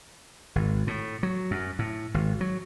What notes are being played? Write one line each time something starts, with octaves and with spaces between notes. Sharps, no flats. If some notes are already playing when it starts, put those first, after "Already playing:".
G#1
A2
F#3
F#2
A2
G#1
F#3